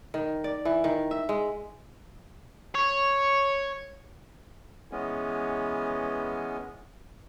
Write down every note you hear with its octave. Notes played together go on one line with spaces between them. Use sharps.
D#3
D5
E3
D#3
E5
G#3
C#5
E3 G#3 B3 C#4